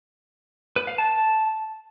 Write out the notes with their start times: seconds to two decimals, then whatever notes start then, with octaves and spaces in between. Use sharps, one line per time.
0.76 B4
0.87 F5
0.98 A5